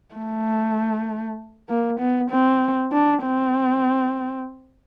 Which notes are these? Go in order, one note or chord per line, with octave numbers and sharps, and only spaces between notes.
A3
A#3
B3
C4
D4
C4